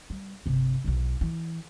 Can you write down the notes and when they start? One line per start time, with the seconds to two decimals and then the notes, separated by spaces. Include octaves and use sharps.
0.10 G3
0.46 G1 C3
0.84 B1 E2
1.21 E3